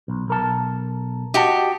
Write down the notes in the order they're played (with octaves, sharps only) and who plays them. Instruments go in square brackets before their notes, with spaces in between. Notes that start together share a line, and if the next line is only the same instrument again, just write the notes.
[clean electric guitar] B1
B1 A#4 A5
[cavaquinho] F#4 G4 [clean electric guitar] D#5 A5